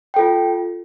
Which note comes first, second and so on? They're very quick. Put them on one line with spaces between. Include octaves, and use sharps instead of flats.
G5 A4 F4